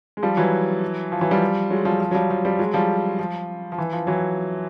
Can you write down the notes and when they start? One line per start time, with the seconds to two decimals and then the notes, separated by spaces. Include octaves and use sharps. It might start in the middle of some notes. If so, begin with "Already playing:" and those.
0.17 G#3
0.23 F3 G3
0.37 E3 F#3
1.12 F3
1.21 E3 F#3
1.31 F3 G3
1.70 F#3 G#3
1.85 F3 G3
2.00 F3
2.11 F#3
2.14 F3 G3
2.30 F3
2.45 F3 G3
2.59 F#3 G#3
2.74 F3 G3
3.19 F3
3.72 F3
3.78 E3
3.93 F3
4.07 E3 F#3